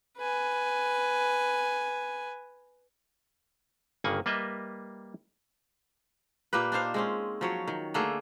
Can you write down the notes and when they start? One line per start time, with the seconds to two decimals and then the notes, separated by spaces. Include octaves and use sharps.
0.18 B4 G#5
4.04 G1 G2 C#3 A#3 F#5 G#5
4.26 G3 A#3 B4 D#5 E5
6.53 A#2 A#3 G4 B4
6.72 D4 D#4 C5 F5
6.94 G#3 C4 C#4
7.41 F3 F#3 C#5
7.68 D#3
7.94 D3 A3 A#3 G#4